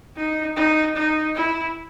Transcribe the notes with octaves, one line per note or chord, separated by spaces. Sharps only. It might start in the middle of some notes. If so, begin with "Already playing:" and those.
D#4
D#4
D#4
E4